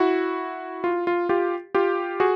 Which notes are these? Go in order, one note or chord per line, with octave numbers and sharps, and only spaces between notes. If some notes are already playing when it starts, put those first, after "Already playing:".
Already playing: E4 F#4
F4
F4
F4 G4
F4 G4
F#4 G#4